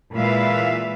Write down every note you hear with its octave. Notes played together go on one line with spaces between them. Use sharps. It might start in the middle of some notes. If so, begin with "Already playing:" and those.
A#2 E3 G#3 B4 E5 F5